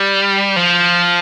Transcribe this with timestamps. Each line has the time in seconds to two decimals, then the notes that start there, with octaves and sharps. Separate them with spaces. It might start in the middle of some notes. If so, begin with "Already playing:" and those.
Already playing: G3
0.56 F3